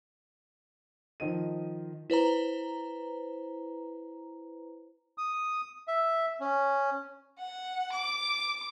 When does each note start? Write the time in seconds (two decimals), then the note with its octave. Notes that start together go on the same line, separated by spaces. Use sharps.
1.20 D#3 F3 D#5 D#7
2.10 E4 B4 C5 A#5
5.18 D#6
5.88 E5
6.40 C#4
7.39 F#5
7.93 D6